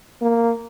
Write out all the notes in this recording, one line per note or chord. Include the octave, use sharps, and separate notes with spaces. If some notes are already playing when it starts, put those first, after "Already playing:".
A#3